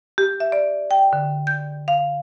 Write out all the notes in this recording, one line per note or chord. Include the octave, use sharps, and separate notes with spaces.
G4
E5
D5
G5
D3
G6
F5